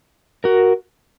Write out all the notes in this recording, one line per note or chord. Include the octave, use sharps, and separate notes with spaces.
F#4 A#4